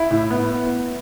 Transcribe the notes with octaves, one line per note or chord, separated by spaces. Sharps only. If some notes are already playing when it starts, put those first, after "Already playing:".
Already playing: E4
A2
B3